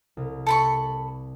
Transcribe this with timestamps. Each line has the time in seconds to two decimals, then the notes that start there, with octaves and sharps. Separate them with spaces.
0.17 C2
0.47 A4 B5 C#6